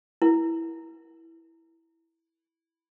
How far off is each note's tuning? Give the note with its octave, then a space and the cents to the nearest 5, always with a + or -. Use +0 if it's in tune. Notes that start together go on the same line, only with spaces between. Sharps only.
E4 +0 A#4 +30